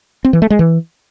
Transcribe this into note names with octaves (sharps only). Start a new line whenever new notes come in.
C4
E3
A3
G#3
E3